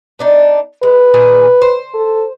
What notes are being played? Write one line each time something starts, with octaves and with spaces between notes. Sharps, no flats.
B3 D4 D#4
G#3 B4
A#2 D#3 G#4
C5
A4